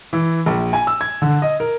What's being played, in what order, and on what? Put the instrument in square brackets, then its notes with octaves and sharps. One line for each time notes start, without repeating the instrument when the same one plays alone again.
[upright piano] E3
A#1
G#5
E6
G#6
D3
D#5
A#4